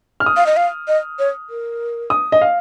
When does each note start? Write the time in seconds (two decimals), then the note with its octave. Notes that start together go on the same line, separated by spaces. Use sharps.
0.20 F6
0.26 D#6
0.37 F5
0.46 D#5
0.57 F5
0.88 D#5
1.19 C#5
1.50 A#4
2.10 D#6
2.32 D#5
2.41 F5